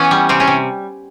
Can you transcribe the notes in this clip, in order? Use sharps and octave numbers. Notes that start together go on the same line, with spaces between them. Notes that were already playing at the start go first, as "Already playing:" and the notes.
Already playing: E3 B3 C#4
G3
C3 C4
C#4
C3